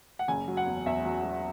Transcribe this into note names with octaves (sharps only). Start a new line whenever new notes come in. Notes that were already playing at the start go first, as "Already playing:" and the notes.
F#5
F#1 G#5
F#3
F#5
E2
E2 E5
F#3
F#3